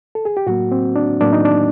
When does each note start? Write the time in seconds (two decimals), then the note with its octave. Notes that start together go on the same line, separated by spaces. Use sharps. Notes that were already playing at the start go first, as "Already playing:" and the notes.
0.15 A4
0.25 G#4
0.37 G4
0.47 A2 F#3 A#3 F#4
0.72 C4
0.96 D4
1.21 A2 F#3 A#3 D4
1.33 D#4
1.45 D4